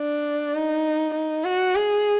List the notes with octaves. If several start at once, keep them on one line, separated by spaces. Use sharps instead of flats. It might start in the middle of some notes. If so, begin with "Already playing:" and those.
Already playing: D4
D#4
D#4
F#4
G#4